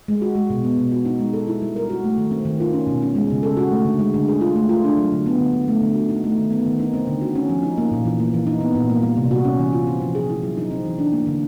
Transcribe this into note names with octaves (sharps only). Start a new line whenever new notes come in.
G#3
F#4
G#3
B2
B3
B2
F#4
D#4
G#3
A4
E4
G3
A#4
F#4
A3
D#3
C4
D#3
F4
C#4
B2
C#4
G#3
C#3
A4
F#4
A3
D3
G#3
D3
G#4
F4
A3
F4
D4
F#3
D3
B3
D3
D3
A3
D3
F#4
D#4
A3
D#3
B3
D#3
D#4
C4
D3
F#4
C#4
F3
D#4
A#3
A#2
E3
A#3
E3
D#4
B3
A#2
A#3
G3
C3
F#4
C#4
E3
F4
C4
F3
G#4
E4
F#3
D#4
C4
E3
D4
A#3
D3